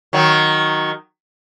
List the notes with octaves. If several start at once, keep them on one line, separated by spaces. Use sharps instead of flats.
D#3 F#3